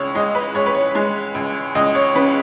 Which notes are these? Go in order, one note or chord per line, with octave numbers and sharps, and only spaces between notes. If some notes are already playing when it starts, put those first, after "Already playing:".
Already playing: C#2 G#3 C#5
G#3 D#5
B4
G#3 C#5
B4
C#5
G#3
C#2
C#2 D#5
C#5
C#3 B4